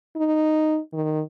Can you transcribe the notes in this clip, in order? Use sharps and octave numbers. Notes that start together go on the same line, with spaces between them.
D#4
D#3